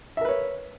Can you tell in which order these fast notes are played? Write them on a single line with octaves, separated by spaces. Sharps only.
E5 A#4 B4 C#5